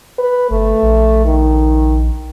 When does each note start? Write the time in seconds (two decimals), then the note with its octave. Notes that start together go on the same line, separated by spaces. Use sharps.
0.18 B4
0.50 G1 A3
0.82 A#1
1.25 D#3